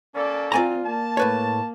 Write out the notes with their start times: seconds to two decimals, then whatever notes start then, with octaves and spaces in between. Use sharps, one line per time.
0.15 A#3 C#4 A4 D5
0.52 C4 F4 D5 G#5 A#5
0.85 A#3 A5
1.17 A2 B4 C#5